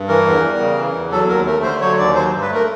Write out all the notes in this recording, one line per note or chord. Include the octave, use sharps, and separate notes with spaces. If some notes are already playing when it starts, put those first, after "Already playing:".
Already playing: G2
E3 A#4
E2
G3
C#3
E3
E2
F#3 A4
D#2 A#4
A3 A#4
D3 C5
F#3 C#5
D#2 D5
F#3 C5
G2
B4
A3 A#4